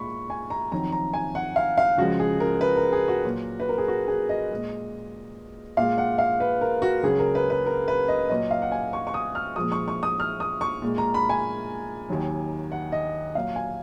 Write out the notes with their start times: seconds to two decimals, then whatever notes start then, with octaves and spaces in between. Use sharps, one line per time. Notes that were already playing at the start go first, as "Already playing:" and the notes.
Already playing: A#2 G#3 B5 C#6
0.30 G#5
0.50 A#5
0.72 F2 D#3 F#3 A#5
0.92 A#5
1.14 G#5
1.35 F#5
1.56 F5
1.78 F5
1.98 C#2 C#3 F3 G#3 F#4
2.20 G#4
2.40 A#4
2.61 B4
2.77 A#4
2.93 G#4
3.08 F#4
3.25 A#2 F#3
3.60 B4
3.69 A#4
3.78 G#4
3.88 F#4
4.08 G#4
4.29 D#5
4.51 A#2 G#3
5.77 A#2 G#3 F5
5.98 F#5
6.18 F5
6.40 B4
6.61 A#4
6.82 F#4
7.03 C#2 C#3 F#3 G#4
7.19 A#4
7.35 B4
7.50 B4
7.66 A#4
7.88 B4
8.08 D#5
8.29 A#2 F#3 D#5
8.51 F5
8.62 F#5
8.72 G#5
8.93 C#6
9.07 C#6
9.14 D#6
9.35 F6
9.56 A#2 F3 G#3 D#6
9.72 C#6
9.88 C#6
10.03 D#6
10.20 F6
10.40 D#6
10.61 C#6
10.82 A#2 G#3
10.98 A#5
11.14 B5
11.29 G#5
12.09 D#2 D#3 F#3
12.72 F#5
12.92 D#5
13.35 A#2 F#3 F5
13.56 G#5